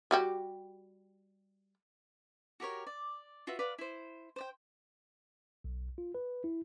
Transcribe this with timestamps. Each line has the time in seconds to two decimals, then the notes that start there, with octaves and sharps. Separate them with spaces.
0.11 G3 F#4 G4
2.60 F#4 G4 A#4 C#5
2.87 D5
3.47 F4 F#4 B4 E5
3.59 B4 D5 F5 F#5
3.78 E4 C5
4.36 C5 D5 G5
5.64 B1
5.98 F4
6.15 B4
6.44 E4